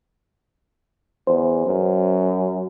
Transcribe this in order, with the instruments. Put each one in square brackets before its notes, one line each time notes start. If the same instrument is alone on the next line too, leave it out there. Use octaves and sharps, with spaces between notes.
[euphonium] E2 [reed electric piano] C5
[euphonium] F#2